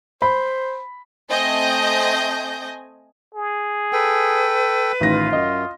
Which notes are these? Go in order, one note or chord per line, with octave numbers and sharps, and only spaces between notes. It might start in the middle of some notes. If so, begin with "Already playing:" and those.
C5 B5
A3 C4 D#5 G#5 G6 A#6
G#4
A4 B4 G5
A1 D#3 F4 A#6
F#2 D#5